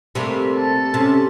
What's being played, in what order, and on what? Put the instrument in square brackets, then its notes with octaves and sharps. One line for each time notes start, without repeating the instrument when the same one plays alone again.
[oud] C3 [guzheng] G3 A3 A#3
[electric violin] A4 A5
[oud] C3 [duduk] C#4